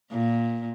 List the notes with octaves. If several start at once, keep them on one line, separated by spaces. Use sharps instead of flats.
A#2